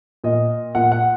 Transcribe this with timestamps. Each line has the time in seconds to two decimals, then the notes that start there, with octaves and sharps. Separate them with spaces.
0.24 A#2 D#5
0.75 A#2 F#5
0.92 F#5